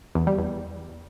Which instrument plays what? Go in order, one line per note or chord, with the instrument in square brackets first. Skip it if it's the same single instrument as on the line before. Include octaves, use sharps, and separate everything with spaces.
[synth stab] E2
G3
E2